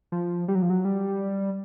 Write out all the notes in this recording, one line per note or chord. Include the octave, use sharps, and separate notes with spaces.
F3
G3
F#3
F3
F#3
G3